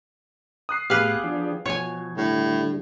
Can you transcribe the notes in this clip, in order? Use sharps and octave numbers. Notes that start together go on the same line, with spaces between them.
D#6 F#6 C7
A2 B3 G4 G#4 B4 F5 F#6
F3 D4
B2 F3 C#5 G#5 G#6
A2 D3 G3